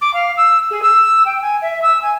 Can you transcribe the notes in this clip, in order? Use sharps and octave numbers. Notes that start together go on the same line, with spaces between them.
D6
F5
E6
G#4
E6
G5
G#5
E5
E6
G#5